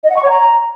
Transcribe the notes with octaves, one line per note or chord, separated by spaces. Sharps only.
D#5
F#5
C#6
C#5
A#5